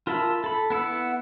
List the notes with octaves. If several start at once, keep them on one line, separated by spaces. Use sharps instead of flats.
F4 A#4 E5 A5 B5
A4 B5
B3 E4 F#5 E6